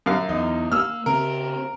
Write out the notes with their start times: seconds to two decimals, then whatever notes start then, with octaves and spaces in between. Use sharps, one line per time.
0.06 F#2 F5
0.29 E2 D#4
0.72 A#3 E6 F6
1.06 C#3 C4 A#4